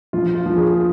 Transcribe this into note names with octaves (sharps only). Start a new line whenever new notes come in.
F3 F4
F4
F3
G#4